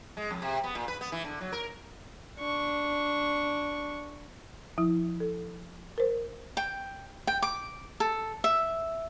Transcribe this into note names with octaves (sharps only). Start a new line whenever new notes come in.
G#3
F2
C3
B3
A#2
B4
B3
E3
D3
F#3
A#4
D4 C#6
F3 E4
A4
A#4 C5
G5
G5
D6
A4
E5